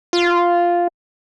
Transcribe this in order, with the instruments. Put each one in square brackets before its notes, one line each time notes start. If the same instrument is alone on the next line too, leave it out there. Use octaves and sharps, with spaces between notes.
[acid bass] F4